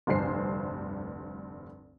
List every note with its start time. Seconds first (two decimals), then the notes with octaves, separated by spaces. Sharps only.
0.07 F1 D2 G2 C5 C7